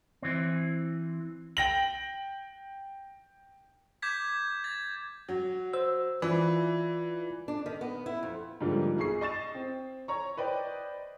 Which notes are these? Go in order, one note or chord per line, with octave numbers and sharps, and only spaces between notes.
E3 C4
G5 A#6 F#7
D6 G6 G#6 B6
A6
F#3
C5 E6
E3 F4 D5 B5
D4
D#3
B3
E4
F2
G#2 D3 F3 G3 A#3 F4
B1 G#4 C#6 C7
D#5 C#6 A6 E7
C4
C#5 A#5 C#6
B4 C5 D5 D#5 G5